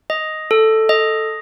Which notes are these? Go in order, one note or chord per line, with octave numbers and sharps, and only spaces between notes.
D#5
A4
D#5